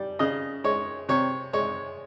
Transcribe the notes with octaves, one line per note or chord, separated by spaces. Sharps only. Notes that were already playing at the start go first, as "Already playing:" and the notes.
Already playing: G3
C#3 D#5
G#3 C#5
C3 C#5
G#3 C#5